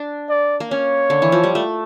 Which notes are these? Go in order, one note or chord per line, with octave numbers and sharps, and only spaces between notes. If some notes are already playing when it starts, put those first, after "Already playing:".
Already playing: D4
D5
A#3
C#4 C#5
D3
E3
F3
G3
A3